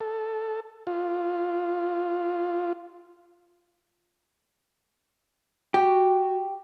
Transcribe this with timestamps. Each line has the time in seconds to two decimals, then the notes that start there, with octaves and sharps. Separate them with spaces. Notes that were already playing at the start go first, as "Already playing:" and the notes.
0.01 A4
0.87 F4
5.74 F#4 G4